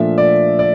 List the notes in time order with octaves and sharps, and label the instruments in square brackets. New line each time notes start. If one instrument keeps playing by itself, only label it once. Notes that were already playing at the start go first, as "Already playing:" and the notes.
Already playing: [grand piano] A#2 F3 A3 D4 E5
D5
D5